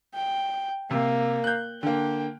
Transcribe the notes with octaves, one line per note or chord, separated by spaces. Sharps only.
G5
C3 A#3
F#6 G6
D3 A#3 G5